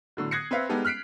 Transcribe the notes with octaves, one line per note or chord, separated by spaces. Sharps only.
A2 D3 F#3
D#6 F#6 G#6 A#6 C7 C#7
C4 B4 C5 E5 F5
G3 G#3 B3 D#4 G4 A4
F6 F#6 B6 C7 D7